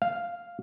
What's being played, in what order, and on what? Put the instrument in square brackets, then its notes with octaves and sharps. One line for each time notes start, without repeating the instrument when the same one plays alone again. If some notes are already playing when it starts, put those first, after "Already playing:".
[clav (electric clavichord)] F5